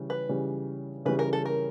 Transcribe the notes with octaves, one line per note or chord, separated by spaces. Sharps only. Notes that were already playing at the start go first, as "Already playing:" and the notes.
Already playing: C#3 E3 G3
B4
C#3 E3 G3
C#3 E3 G3 B4
A#4
A4
A#4